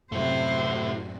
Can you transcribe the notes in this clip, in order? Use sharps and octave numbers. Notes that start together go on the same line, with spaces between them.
F#2 A2 C3 F#3 A3 E4 F#4 C5